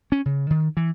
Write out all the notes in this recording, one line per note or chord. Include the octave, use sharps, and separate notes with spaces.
C#4
C#3
D#3
E3